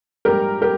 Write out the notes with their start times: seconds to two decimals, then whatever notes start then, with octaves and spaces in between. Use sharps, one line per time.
0.25 A#1 G#2 G3 G4 A#4
0.61 G3 G4 A#4